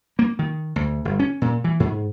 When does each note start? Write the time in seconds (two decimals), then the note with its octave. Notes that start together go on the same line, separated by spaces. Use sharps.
0.19 A#3
0.39 D#3
0.76 D2
1.05 G1
1.19 C#4
1.42 A#2
1.64 E3
1.80 G#2